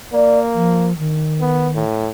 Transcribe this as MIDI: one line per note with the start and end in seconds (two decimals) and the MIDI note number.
0.13 0.90 58
0.13 0.39 74
0.54 0.93 53
0.98 1.82 51
1.41 1.69 59
1.75 2.11 45